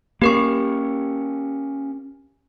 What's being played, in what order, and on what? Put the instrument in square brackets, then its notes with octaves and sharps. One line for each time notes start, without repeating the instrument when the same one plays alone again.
[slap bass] A#3 C#4 [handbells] G4 A#4 C#6